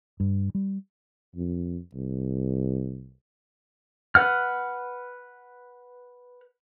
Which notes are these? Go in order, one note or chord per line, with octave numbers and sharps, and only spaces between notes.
G2
G3
F2
C2
B4 F#5 F6